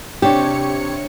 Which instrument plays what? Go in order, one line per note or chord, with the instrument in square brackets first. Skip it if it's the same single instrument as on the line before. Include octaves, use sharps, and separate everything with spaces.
[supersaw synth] C3 C#5 C#7 [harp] D4 C#6 E7 [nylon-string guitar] G4